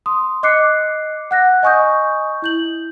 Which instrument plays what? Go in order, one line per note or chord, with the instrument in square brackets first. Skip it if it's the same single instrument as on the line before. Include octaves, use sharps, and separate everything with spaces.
[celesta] C6 D#6
D#5 D6 F#6 C7 C#7
F#5 F#6 A#6
D#5 G#5 C#6 D#6 G6
E4 G6 F#7